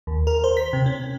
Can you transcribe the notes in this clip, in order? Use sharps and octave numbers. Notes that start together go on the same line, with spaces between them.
D#2
A#4
C5
B6
C3
C#4